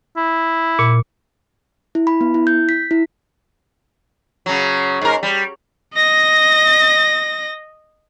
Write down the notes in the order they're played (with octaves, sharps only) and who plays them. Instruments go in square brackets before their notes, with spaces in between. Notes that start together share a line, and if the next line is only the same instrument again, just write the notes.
[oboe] E4
[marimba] A#2
[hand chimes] E4
B5
B3
E4
G6
B6
E4
[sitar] C#3 F#3
G#2 A#4
G3
[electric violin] D#5 A#6